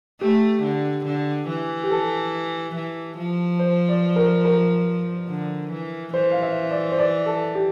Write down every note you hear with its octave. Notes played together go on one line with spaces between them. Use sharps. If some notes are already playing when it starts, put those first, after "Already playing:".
A3 G4
D3
D3
E3
G4
A4
E3
F3
C5
D5
A#4
A#4
D3
E3
E3 C5
F5
E5
D5
C5
D5
A4
G4